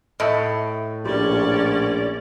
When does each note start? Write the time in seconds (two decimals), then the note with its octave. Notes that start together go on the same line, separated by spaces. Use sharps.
0.20 A2 D#5 E5
1.06 A#1 C#4 G4 D5